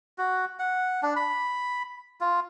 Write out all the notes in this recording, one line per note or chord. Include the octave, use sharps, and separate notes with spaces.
F#4
F#5
D4
B5
F4